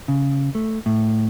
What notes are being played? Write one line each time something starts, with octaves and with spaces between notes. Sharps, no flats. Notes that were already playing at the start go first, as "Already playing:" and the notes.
C#3
A3
A2